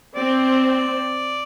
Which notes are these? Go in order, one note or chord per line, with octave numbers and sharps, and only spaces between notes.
C4 D5